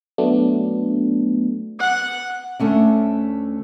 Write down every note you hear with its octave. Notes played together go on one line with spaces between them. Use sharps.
F#3 A3 B3 D4
F#5
D2 A3 C#4 D4